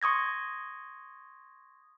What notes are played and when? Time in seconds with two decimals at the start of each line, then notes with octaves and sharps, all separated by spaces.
0.02 C6 C#6 D#6 G#6 A#6